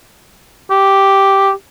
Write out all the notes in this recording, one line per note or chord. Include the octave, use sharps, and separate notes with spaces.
G4